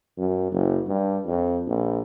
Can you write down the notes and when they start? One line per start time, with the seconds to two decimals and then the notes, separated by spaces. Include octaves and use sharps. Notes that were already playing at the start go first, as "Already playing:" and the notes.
0.18 F#2
0.52 F#1
0.87 G2
1.26 F2
1.67 A#1